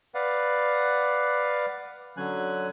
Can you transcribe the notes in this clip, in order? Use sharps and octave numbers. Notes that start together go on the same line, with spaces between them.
B4 D5 F5 F#5
D3 F#3 C#4 G#5 F#6